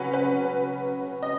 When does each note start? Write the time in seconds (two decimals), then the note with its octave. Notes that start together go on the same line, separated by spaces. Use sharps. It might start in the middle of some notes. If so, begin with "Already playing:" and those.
Already playing: C#3 F#3 C#4 B4 F#5
0.13 B4
1.23 D#5